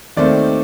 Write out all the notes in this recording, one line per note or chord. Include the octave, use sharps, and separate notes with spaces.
D#2 D#3 A3 C4 D5